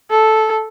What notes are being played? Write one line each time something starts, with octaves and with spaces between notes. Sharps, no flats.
A4